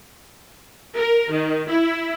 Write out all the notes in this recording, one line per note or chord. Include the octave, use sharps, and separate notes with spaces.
A#4
D#3
E4